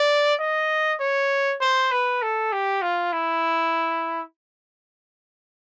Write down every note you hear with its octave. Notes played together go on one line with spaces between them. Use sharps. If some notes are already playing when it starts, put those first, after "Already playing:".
Already playing: D5
D#5
C#5
C5
B4
A4
G4
F4
E4